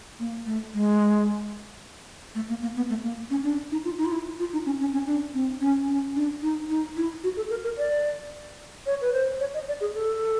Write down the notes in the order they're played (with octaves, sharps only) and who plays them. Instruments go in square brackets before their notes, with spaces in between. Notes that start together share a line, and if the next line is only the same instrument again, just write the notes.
[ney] A#3
A3
G#3
A3
A#3
A#3
B3
A3
A#3
C#4
D4
D#4
F4
D#4
F4
E4
F4
D#4
C#4
C#4
C#4
D4
C4
C#4
C#4
D4
D#4
D#4
E4
F#4
A4
A#4
A#4
D5
C#5
B4
C5
C#5
D#5
D5
G#4
A4